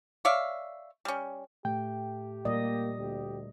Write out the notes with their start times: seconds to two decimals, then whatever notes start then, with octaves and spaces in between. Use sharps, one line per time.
0.25 C#5 D5 E5 F5
1.05 G3 C#4
1.65 A2 A3 G4 G5
2.45 A#2 G3 A#3 D5 D#5
2.99 D2 G4